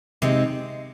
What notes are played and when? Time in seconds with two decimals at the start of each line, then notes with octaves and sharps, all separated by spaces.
0.22 C3 G#3 C4 D#4